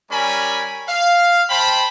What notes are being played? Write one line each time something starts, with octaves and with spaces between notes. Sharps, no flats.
G3 C#4 A#4 G#5 B5
F5
C5 G5 A5 B5